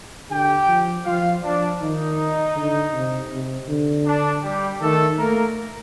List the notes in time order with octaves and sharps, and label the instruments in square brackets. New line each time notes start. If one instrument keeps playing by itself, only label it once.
[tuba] D3 [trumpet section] G4 G5
[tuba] F3
[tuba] F3 [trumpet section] F4 F5
[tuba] F3 [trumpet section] D4 D5
[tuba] D#3 [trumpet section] D#4
[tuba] D3
C3
C3
D3
[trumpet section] D4
G3 G4
[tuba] D#3 [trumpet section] A3 A4
[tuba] A3 [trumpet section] A#3 A#4